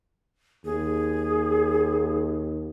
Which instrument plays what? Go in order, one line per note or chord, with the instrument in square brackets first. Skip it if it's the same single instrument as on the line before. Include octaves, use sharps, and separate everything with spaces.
[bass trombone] D#2 [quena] G#4